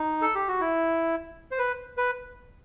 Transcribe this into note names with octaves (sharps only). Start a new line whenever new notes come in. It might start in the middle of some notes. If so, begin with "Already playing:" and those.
Already playing: D#4
A4
G4
F#4
E4
C5
B4
B4